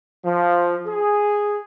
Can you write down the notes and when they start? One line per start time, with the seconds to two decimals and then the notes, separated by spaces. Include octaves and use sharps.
0.25 F3
0.86 G#4